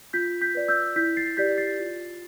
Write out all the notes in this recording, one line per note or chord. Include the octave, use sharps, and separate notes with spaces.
F4 G6 B6
G6 B6
B4 D5
E6 G6
E4 G6 B6
A6 C7
G4 D5 G6 B6
A6 C7
F4